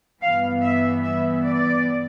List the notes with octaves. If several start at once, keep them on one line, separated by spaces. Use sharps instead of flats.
G2 E3 B3 F5
E5
E5
D5